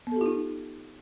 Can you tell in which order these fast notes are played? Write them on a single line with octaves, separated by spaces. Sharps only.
B3 A4 G4 F4 D#4